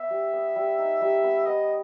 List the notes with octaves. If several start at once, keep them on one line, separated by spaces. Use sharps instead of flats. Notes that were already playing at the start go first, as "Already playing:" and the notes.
Already playing: B3 E5
G3
B3
G3
D#4
G3
B3
B3 D#5